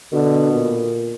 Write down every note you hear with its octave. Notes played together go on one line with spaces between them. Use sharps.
B2 D3
A#2